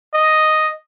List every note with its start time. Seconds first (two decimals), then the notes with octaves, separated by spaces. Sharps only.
0.14 D#5